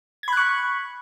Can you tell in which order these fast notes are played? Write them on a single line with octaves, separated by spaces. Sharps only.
G#6 B5 F#6 C#6